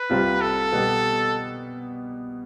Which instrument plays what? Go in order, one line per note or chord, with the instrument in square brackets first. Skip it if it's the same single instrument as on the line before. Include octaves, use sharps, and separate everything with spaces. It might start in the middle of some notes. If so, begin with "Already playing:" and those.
Already playing: [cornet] B4
[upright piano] C2 C3 G3 C4 F4
[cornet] A4
[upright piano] B2 G3 B3